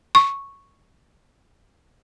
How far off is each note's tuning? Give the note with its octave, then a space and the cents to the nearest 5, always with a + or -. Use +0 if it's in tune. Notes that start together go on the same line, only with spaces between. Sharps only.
C#6 -5